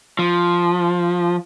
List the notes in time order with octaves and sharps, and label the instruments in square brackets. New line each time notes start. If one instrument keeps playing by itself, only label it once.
[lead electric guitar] F3